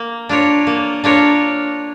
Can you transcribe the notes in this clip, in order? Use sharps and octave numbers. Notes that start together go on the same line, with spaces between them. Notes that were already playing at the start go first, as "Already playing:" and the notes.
Already playing: A#3
D4 F4 A#4 C#5
A#3
D4 F4 A#4 C#5